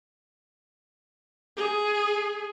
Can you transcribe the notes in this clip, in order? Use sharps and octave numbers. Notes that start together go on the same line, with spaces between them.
G#4